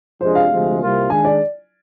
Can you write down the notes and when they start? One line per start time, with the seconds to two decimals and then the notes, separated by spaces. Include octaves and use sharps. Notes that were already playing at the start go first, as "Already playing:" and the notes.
0.21 F2 C3 F3 G#3 D4 C5
0.35 F5
0.50 D2 C3 F3 G#3
0.80 C2 C3 G3 A#3 F4
1.10 D#3 G#3 D4 G#5
1.25 D5